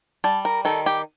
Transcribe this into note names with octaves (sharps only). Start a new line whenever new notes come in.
G3 A5
A#4
D#3 A4
G4